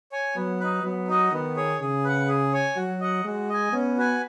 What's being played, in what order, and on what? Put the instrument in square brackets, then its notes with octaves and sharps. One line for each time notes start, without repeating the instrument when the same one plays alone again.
[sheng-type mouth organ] C#5 G#5
[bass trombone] F#3 [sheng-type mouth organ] B3
[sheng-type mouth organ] D#4 B4
[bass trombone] F#3 [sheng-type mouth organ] B3
[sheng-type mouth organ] D#4 F#4 D#5
[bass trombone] D#3 [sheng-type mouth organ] B3
[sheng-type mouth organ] G#4 C#5
[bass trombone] C#3 [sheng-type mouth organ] G#4
[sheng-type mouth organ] B4 F#5
G#4
C#5 G#5
[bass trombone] F#3 [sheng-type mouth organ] F#4
[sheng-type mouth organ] D#5 F#5
[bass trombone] G#3 [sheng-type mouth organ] F#4
[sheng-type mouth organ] D#5 G#5
[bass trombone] B3 [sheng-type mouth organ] C#4
[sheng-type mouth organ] F#4 B4 G#5